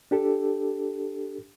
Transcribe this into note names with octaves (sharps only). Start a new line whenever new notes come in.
D4 G4 A4